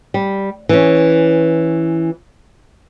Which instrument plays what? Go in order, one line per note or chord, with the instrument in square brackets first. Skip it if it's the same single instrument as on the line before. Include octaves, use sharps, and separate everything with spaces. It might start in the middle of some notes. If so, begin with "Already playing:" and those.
[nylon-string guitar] G3
E3 C#4